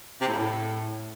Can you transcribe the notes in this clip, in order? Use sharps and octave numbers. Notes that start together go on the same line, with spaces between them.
C3
A2
C#3
A2